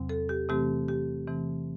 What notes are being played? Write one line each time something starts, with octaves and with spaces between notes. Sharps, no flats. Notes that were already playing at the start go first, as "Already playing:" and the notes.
Already playing: E2 C3 F#3 C4
A4
G4
C3 E3 A3 C4 G4
G4
C3 E3 A3 C4